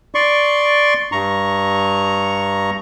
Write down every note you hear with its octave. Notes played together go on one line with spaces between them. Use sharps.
D5 C6 C#6
G2 A#5 C#6